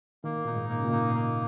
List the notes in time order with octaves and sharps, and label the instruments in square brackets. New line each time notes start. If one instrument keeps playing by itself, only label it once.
[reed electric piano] D#3 [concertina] A#3
[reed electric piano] A#2 [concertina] D#4
[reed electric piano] G#2
[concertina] A#3
[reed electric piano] C#3
A#2
[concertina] D#4
A#3